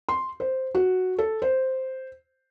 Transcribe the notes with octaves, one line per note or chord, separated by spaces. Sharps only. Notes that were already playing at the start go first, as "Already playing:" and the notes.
C6
C5
F#4
A4
C5